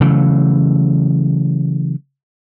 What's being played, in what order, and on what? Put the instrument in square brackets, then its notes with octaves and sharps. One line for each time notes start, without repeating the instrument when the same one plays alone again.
[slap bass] C#3 E3 F#3 A3